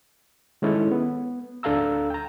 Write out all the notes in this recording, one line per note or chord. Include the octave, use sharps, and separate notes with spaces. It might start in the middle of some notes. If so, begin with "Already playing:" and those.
D#3 G#3 C#4 E4 A4 C#5
B3
D2 D4 A4 F5 A#5 E6
G5 A#5